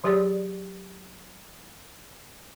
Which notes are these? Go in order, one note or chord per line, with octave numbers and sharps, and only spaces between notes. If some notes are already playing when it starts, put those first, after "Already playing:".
E3 F#3 G4 G#4 C#5 D5